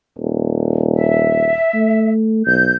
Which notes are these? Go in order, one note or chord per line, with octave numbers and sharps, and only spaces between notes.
D#1
E5
A3
B1 G6